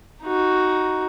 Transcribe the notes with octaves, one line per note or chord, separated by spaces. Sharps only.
D#4 F#4